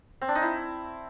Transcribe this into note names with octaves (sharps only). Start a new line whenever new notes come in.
C4
D4
D#4
E4